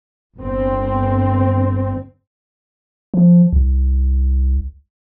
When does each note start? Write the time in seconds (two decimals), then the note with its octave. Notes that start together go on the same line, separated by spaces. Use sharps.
0.37 G1 C4
3.14 F3
3.53 C2